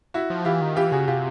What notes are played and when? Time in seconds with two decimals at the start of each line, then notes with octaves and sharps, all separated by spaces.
0.14 E4 F#4
0.30 F3
0.45 E3 F4 G4
0.61 D#3
0.76 E3 F4 G4
0.92 C#3 F#4 G#4
1.08 C3 F4 G4